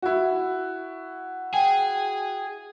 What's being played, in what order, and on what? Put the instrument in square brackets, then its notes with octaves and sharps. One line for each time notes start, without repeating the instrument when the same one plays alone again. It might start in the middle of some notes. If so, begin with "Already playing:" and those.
[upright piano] E4 F#4
[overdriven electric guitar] G#4 [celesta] G5 G#5